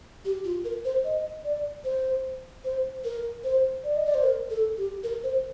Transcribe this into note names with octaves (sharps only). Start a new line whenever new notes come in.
G4
F4
A#4
C5
D#5
D5
C5
C5
A#4
C5
D5
D#5
D5
C5
A#4
A4
G4
A#4
C5